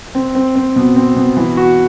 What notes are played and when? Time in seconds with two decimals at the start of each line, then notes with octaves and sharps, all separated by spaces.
0.15 C4
0.35 C4
0.56 C4
0.76 B2
0.96 C4
1.16 B2
1.37 E3
1.57 F#4